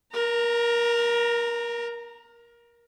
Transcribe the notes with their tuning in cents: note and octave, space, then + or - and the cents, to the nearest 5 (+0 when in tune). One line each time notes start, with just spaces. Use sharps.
A#4 +20 A#5 -20